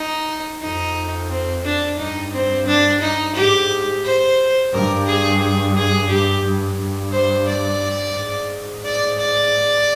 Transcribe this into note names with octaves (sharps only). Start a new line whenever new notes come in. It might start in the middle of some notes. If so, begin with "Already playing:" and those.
Already playing: D#4
F2 D#4
C4
D4
G2 D#4
C4
D4
D#4
G#2 G4
C5
G2 A#4
G#4
G#4
G#4
G2 G4
G2
G2
C5
D5
G#2
D5
D5